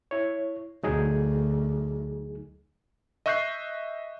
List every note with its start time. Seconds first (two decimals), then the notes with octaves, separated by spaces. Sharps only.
0.11 E4 C#5
0.83 D2 F#3 D#4 G#4
3.26 D#5 E5 C#6 F#6 G6 C7